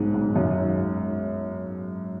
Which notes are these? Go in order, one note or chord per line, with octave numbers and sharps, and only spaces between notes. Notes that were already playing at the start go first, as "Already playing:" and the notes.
Already playing: B1 G#2 B2
G#2
F#2